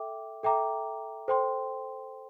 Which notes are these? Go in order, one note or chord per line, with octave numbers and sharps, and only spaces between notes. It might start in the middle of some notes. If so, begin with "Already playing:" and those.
Already playing: A4 E5 G5 D6
A4 E5 G5 A#5 D6
A4 C5 G5 C6